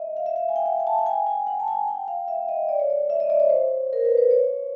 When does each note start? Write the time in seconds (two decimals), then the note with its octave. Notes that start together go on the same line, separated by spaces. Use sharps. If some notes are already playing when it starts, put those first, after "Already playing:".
Already playing: D#5 E5
0.17 F5
0.26 E5
0.36 F5
0.49 G#5
0.56 G5
0.66 F#5
0.80 G#5
0.87 A5
0.99 G5
1.06 G#5
1.27 G#5
1.47 F#5
1.60 A5
1.68 G#5
1.88 G5
2.08 F5
2.28 E5
2.49 D#5
2.69 D5
2.79 C#5
2.90 D5
3.10 E5
3.20 D#5
3.30 D5
3.40 C#5
3.49 C5
3.93 A#4
4.05 B4
4.18 C5
4.31 C#5